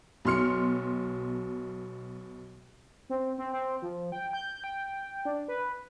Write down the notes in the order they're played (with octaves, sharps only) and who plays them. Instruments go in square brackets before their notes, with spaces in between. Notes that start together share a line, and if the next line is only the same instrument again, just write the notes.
[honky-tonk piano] B1 B2 C6 F6 C#7
[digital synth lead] C4
C4
C4
F3
G5
G6
G5
D4
B4